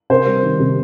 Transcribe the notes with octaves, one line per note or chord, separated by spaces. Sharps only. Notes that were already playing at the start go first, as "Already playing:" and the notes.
C3 A#4 C5
G3
D#3
C3